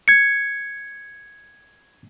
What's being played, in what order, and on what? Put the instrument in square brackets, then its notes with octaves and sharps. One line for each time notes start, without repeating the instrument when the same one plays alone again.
[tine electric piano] G#6 C#7